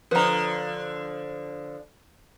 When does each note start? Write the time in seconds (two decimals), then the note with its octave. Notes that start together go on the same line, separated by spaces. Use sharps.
0.11 D3 F3 B4 A#5